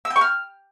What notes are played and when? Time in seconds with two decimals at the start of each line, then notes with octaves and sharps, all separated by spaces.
0.05 E6
0.10 G5
0.16 C#6
0.21 F6